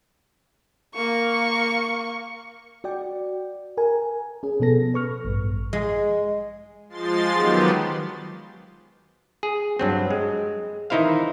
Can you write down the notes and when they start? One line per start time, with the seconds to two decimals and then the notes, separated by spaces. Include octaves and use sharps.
0.94 A#3 C#6
2.84 F#4 D5 G5
3.77 A#4 G#5
4.43 C#4 G#4
4.60 B2 F3 B3 A4 A#6
4.94 B4 C#6 F6
5.25 A1 G2
5.73 G#3
6.89 F3 G#3 C6 A6
7.32 D#3 F#3 B3 G4
9.43 G#4
9.79 G2 F#3 C4
10.11 G#3
10.90 D#3 E3 D#4 E4 C5 F5